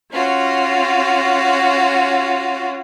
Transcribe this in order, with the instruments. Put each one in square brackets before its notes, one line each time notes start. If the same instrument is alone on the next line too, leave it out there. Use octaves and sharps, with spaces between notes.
[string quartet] C#4 F4 F#4